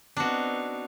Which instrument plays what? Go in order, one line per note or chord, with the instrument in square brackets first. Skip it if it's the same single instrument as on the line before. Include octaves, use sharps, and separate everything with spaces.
[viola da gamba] B3 C4 D#4 [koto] D4 F#4